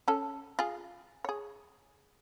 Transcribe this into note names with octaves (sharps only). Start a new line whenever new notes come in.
C#4 A4
F4 G#4
G#4 C#5